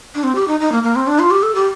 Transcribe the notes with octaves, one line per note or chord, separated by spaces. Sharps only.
D4
C4
G4
D#4
D#4
A#3
A#3
C4
D4
F4
G4
A4
G4